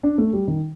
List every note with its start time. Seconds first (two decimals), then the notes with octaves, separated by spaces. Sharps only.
0.03 D4
0.18 A3
0.33 G3
0.48 D#3